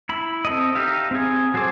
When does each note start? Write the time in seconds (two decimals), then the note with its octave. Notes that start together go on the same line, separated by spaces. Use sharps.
0.09 E4 B5
0.45 C4 A4 D#5
0.75 D#4 G4 E5 F5
1.11 C4 G#4
1.54 F#3 G#4 A4 C5 D6